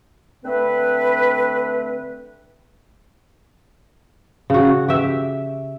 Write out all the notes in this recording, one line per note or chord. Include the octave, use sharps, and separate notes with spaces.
D3 A3 C4 B4
C#3 F#4
G4 E5